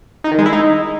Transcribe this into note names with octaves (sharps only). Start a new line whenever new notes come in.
D#4
D#3
G#3
E4
D#4